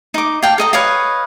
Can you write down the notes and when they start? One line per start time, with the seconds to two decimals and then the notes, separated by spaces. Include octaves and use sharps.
0.14 D#4 D6
0.43 F5 G5 A5
0.58 A4 D#5 A#5
0.73 B4 C#5 D#5 F5